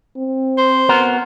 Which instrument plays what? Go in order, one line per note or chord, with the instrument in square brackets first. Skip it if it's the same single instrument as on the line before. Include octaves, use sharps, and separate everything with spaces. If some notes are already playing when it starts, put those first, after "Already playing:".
[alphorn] C4
[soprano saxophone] C5
[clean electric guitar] B3 F#4 A#4